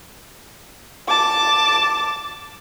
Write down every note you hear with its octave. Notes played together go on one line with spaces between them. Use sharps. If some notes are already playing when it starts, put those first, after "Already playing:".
A5 D6